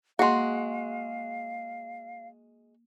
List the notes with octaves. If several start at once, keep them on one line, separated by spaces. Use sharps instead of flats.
G#3 A#3 F#4 G#4 F5 F#5 C6